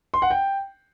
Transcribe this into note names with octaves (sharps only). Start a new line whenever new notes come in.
C6
F#5
G5